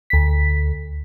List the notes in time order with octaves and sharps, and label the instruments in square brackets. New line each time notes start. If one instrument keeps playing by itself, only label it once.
[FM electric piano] D2 B6